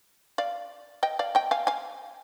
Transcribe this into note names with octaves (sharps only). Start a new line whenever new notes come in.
D5 F5
D#5 G5
D5 F5
D#5 G5
F5 G#5
F5 G#5